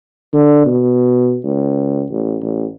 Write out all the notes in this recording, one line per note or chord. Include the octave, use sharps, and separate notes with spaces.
D3
B2
C#2
A1
A1